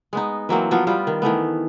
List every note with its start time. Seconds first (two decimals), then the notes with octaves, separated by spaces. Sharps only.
0.13 G#3 B3 D#4
0.49 E3 F#3 A#3 C4
0.71 F3 F#3 B3 F4
0.87 G3 B3 F4 G4
1.07 D#3
1.22 D#3 E3 A3 B3